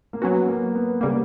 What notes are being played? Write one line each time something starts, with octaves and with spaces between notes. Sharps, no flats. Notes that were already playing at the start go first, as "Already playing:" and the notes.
A#3
F#3 B3 C#4 F#4
A#3
B3
C#3 G3 A#3